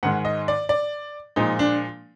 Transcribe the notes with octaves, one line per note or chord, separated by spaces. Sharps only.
G#2 D#3 G#3 F#5
D#5
D5
D5
A#2 F3 G#3 D#4
D4